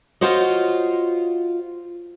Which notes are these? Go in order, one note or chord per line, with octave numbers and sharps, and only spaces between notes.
F4 F#4 C5 C#5 D#5